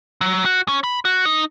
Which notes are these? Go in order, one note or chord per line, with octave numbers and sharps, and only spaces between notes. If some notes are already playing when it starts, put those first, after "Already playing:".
F#3
F#4
C#4
B5
F#4
D#4